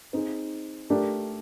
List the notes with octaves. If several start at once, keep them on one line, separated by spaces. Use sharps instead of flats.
C4 D#4 G#4
A3 D4 G4 A#4 D5